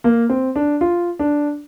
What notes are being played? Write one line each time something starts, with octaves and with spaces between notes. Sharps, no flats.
A#3
C4
D4
F4
D4